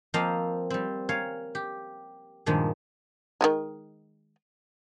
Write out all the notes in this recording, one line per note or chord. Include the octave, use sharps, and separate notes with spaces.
F3 A#3 C4 D#5 F5
G3 C4
A#4 C#5 F5 G#5
G4
G2 A#2 D#3 F3 G#3
D#3 F3 G#3